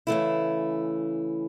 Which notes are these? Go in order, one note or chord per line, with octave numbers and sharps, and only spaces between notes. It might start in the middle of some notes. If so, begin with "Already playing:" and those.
C#3 E3 A3 E4